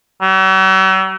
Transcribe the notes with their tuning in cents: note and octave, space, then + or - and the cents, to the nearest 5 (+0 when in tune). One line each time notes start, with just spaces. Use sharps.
F#3 +45